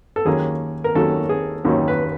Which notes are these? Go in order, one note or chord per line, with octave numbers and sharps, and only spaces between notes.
A4
D#2 D#3 F#3 A#3 C#4 G#4
A#4
D#2 D#3 F#3 A#3 C#4 A4
G#4
D#2 D#3 F#3 A#3 C#4
B4